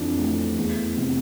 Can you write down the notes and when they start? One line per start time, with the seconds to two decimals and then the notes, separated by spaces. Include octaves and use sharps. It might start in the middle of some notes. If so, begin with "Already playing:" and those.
Already playing: F2 E3 D4
0.18 A3
0.58 E2
0.97 C3